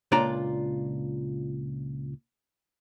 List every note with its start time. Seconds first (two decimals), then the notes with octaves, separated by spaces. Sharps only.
0.12 C#2 A#2 D4 F4 D5 A#5